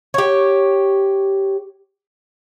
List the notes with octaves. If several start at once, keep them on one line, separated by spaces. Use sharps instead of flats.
G4 C#5